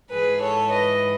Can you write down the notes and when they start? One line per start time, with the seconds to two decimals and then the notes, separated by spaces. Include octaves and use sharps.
0.12 G#2 E3 G#4 B4
0.42 A4 C#5
0.72 B4 D#5